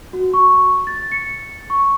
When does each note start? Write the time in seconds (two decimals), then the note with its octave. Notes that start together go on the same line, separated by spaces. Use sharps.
0.13 F#4
0.34 C#6
0.87 A6
1.12 C#7
1.70 C#6